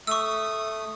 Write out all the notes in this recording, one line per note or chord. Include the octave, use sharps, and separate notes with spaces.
A3 C#6 D#6 E6